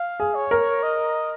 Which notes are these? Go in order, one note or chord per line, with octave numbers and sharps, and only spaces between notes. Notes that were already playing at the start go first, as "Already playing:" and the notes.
Already playing: F5
G#4
C#5
A#4
D#5